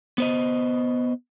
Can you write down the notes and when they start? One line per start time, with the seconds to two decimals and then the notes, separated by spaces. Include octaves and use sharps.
0.18 B3 C5 D#5